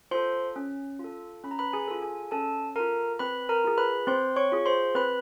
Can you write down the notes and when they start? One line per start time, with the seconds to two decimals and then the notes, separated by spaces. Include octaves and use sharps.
0.11 F4 C5 C6
0.15 A4
0.56 C#4
0.99 F4 A4
1.43 C#4 B5
1.51 A#5
1.59 B4 B5
1.73 G#4 G#5
1.88 F4 A4
2.02 G#4 G#5
2.31 C#4 A4 A5
2.76 F4 A4 A#4 A#5
3.19 C4 B4 B5
3.49 A#4 A#5
3.64 F4 G#4
3.78 B4 B5
4.07 C4 C5 C6
4.36 C#5 C#6
4.52 F4 G#4
4.66 C5 C6
4.95 C4 B4 B5